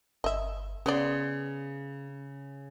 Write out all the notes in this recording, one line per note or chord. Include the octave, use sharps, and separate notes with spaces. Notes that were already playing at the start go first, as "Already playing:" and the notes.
G1 D#5 E5
C#3 B3 C#4 D5 C6